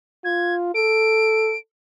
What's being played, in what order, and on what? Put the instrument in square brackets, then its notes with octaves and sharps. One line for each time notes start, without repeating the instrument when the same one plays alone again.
[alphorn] F4 [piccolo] G#6
[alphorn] A4 [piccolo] D7